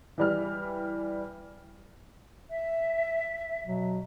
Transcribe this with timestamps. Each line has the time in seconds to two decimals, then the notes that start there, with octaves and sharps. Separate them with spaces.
0.18 E3 G3 F6
2.50 E5
3.64 B2 F#3